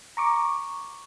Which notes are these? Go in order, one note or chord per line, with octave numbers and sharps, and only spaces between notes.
A#5 C#6 D6